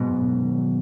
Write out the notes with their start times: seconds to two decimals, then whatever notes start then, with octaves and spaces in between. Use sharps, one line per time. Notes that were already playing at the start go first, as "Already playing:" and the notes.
Already playing: G#2 B2 F#3
0.09 F#2
0.26 F#2
0.42 D#3
0.58 F#3